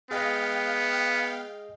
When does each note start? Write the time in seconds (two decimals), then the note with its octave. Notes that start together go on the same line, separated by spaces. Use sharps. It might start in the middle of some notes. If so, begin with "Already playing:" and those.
0.11 B3 G#4 D#5 F5 G5